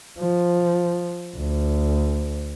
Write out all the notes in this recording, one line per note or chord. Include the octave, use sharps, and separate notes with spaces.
F3
D2